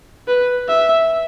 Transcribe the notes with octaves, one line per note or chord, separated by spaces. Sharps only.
B4
E5